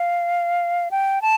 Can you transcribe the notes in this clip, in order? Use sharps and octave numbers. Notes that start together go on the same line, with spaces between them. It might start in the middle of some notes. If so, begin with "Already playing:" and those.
Already playing: F5
G5
A5